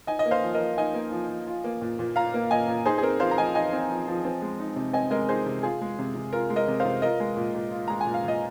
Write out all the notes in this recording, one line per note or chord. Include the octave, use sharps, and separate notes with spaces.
D#4 D#5 G#5
D#5
A#3
C5 F5
F3
A#4 D#5
F3
D#4 D#5 G#5
A#3
F3
F3
F4
A#3
A#2
A#2
F4 F5 A#5
A#3
A#2 D#5 G#5
A#2
D#4 G#4 C5
G#4
C4 A#4
F3 C5 F5
A#5
F3 D#5 G#5
D#4 D#5 G#5
C4
F3
F3
C4
G#3
D#4
C3
C4 D#5 G#5
G#3 A#4 D#5
D#4 G#4 C5
C3
F4 G#4
G#3
C3
C3
F4 A#4
G#3
A#4 D#5
C3
C5 F5
C3
F4 A#4 D#5
G#3
A#2
A#2
F4
G#3 A#5
G#5
A#2
F5
A#2 D#5